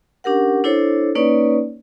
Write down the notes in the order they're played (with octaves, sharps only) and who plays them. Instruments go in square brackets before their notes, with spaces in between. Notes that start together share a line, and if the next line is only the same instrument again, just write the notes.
[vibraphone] C#4 D4 G4 A#4 F#5
D4 E4 A4 C5 C#5
A#3 C#4 D#4 B4 C#5 D5